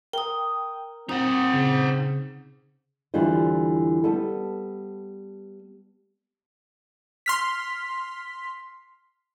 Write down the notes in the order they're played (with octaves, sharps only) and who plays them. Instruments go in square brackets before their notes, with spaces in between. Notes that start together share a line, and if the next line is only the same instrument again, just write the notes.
[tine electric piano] A#4 [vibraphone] G5 D#6
[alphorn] C4 [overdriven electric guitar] D#4 F#5 [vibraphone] D#6
[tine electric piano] C#3
[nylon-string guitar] E2 D3 E3 G3 F4 C5
G3 B3 A4
[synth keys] C6 F6 B6